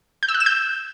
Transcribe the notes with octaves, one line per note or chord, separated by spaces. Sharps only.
G6
E6
F#6
E7
G6